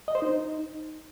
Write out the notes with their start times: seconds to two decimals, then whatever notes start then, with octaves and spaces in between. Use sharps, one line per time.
0.08 D#5
0.15 C5
0.22 D#4